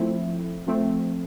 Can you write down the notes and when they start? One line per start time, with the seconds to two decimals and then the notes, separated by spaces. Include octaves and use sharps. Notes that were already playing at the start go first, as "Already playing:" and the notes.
Already playing: F3 A3 C4 E4
0.67 F3 A3 C4